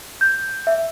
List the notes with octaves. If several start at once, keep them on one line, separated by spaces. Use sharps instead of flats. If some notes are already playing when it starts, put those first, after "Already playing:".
G6
E5